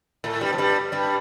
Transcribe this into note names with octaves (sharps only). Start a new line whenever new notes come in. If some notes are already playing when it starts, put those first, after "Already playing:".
A2 A3
G2 G3
F3
G2 G3
G2 G3